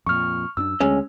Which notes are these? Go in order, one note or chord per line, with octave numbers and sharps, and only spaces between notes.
F2 A#2 C#6 F6
F#2 C4 D4 E6
D2 G#3 C#4